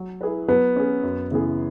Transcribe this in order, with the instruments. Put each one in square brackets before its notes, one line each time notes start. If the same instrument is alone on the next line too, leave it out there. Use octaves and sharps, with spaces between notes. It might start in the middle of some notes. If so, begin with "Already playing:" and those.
Already playing: [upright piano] F#3
E4 G#4 B4
[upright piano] F#3 [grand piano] B3
[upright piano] C#4 G#4
F#2
C#3 E3 B3 G#4